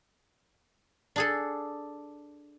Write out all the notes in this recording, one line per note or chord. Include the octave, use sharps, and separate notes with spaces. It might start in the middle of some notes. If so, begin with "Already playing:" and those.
D4 G#4 A4